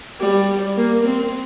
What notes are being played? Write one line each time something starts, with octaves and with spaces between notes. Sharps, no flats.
G3
A#3
C4